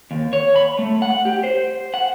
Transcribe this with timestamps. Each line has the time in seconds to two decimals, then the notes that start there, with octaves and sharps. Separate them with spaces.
0.11 D#2
0.33 C#5
0.56 B5
0.79 A3
1.02 F#5
1.25 G4
1.44 C5
1.94 F#5